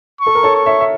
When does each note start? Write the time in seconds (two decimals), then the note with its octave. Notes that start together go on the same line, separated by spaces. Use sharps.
0.21 C#6
0.26 A4
0.35 A#4
0.43 A4 C#5
0.55 C#6
0.66 C#5 E5
0.80 E5